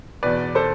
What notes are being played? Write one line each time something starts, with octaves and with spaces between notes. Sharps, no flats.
E2 B2 B4 D5
A4 C5